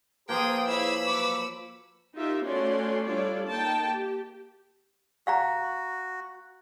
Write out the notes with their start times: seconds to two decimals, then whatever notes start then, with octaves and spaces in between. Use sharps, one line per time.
0.29 F3 A#3 G#4 B4 C5 G5 A#5 D#6
0.68 E4 G#4 C#5 B5 E6
1.07 F#3 C#6 D6
2.16 D#4 F4 G4 A#4 E5
2.45 A3 C#4 F#4 C#5 D5 C6
3.05 G3 D4 F4 A4 C#5 D5
3.49 A#3 D#4 G5 A5
3.89 G4
5.27 F#4 F5 F#5 A#5